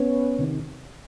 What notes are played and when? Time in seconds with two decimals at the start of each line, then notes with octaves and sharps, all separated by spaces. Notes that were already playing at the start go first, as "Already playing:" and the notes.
Already playing: B3 C#4
0.39 C3 D#3